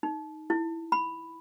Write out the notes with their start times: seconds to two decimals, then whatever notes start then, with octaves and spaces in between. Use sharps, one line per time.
0.03 D#4
0.50 E4
0.92 B5